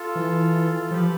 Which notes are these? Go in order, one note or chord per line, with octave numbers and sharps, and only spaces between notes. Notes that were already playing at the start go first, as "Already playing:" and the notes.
Already playing: F4 A4
E3
F3 G4 B4